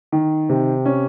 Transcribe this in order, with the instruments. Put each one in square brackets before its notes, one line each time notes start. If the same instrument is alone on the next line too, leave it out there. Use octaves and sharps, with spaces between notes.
[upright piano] D#3
C3
C#4